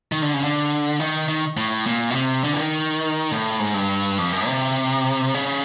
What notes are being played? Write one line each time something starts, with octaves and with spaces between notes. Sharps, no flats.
D#3
D3
C#3
D3
D#3
D#3
A2
A#2
B2
C3
D3
E3
D#3
A2
G#2
G2
F2
F#2
C3
C#3